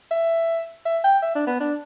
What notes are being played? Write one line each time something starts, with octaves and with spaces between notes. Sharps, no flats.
E5
E5
G5
E5
D4
B3
D4